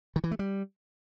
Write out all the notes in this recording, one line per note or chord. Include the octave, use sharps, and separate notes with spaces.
D#3
E3
A3
G3